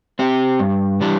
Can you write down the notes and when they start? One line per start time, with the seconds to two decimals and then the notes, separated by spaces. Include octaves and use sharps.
0.19 C4 G4
0.59 G2
1.01 E3 G3 D4